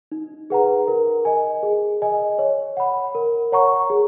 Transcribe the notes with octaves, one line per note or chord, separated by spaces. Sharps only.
D#4
G#4 B4 F#5 A#5
A#4
D#5 G#5
G#4
D#5 G#5
C#5
F#5 B5
A#4
C#5 F#5 A#5 C#6
G#4